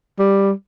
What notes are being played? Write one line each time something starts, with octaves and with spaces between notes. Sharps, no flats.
G3